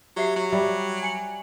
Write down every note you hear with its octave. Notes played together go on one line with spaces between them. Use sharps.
F#3 G4 E5 C7
F#3
G3 E5
G#5 C#7 F#7